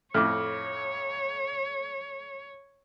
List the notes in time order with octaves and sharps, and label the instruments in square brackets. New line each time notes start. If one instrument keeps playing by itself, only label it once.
[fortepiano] F2 A2 [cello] C#5 [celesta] D6 F6